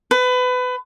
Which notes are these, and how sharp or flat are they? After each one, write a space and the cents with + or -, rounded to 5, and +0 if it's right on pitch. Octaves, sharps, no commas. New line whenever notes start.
B4 +25